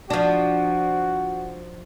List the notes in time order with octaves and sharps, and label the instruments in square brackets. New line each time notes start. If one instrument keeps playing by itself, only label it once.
[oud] F3 D4 [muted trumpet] F#4